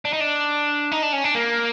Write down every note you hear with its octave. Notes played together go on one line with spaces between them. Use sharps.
D4
D#4
D4
D#4
D4
C#4
D4
A#3